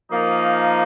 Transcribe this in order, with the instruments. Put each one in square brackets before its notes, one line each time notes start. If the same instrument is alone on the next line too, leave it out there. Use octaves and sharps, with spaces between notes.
[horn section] F3 A#3 D#4